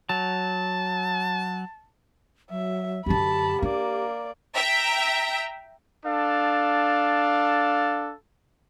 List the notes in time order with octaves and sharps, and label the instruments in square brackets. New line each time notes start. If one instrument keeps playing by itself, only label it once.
[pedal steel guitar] F#3 [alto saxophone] A5
[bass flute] F#3 [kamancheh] E5
[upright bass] F#2 D3 [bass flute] G4 [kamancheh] A5 B5
[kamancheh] A#3 D5 [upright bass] D4
[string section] E5 G5 A#5
[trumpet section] D4 A4 F5